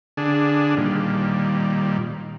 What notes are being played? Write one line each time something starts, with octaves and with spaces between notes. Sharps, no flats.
D3 D4 G#4
A#2 D#3 G3